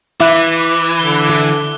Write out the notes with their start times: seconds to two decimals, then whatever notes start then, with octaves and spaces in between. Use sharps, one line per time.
0.20 E3 E4 D6 F#6
1.00 D3 G7